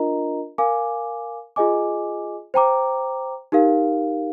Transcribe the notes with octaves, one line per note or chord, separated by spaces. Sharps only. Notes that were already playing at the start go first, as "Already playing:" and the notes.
Already playing: D4 F4 A#4 D#5 A#5
A#4 F5 G#5 D6
F4 G#4 D#5 G#5 D6
C5 G5 A#5 D6
D#4 G4 A#4 F5